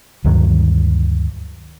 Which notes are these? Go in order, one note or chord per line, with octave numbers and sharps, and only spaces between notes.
D2 G2 D#3 F#3